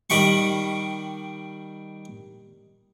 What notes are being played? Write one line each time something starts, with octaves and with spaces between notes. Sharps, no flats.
D#3 G3 G5 B5 C#6